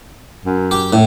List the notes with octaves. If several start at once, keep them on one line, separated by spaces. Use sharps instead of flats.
F#2
G4
A2 A3